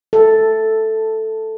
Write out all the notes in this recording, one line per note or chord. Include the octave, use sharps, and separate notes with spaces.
A4